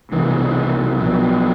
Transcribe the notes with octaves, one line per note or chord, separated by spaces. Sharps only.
C2 B2 E3
B1 B2 F3